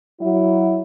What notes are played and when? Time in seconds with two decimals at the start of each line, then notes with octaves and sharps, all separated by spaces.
0.21 F#3 E4